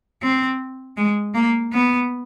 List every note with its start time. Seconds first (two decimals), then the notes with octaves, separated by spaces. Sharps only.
0.22 C4
0.97 G#3
1.34 A#3
1.73 B3